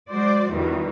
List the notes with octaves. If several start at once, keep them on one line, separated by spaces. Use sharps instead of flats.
F#3 G#3 F#4 C5 D5
E2 G2 B2 D#3 E3